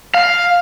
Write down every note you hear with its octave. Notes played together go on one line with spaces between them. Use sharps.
F5